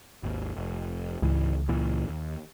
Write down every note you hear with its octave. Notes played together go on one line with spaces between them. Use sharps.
G#1 D#2
F1
C#2 G#2 E3
A#2 E3
D#2